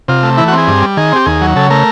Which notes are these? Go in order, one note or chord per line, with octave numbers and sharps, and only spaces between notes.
C3 F4
A3
E3 E4
F#4
C4
G#4
G2
G3
D#3 G#4
C4 G4
D#2 G#4
F#3
C#3 A4
A3 A#4